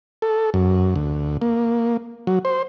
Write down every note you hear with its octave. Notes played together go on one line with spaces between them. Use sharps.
A4
F#2
D2
A#3
F#3
C5